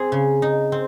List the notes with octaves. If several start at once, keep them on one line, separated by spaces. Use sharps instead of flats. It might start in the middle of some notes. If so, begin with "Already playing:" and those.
Already playing: C4 G#4
C#3
D#4
C4